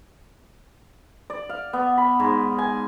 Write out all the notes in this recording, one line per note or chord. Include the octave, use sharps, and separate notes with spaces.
D5
F5
B3
B5
G#2
G#5